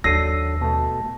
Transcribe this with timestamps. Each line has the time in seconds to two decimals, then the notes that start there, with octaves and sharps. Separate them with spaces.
0.04 D#2 F#3 D4 A4 E6 A#6 C7 D#7
0.61 B2 A3 A5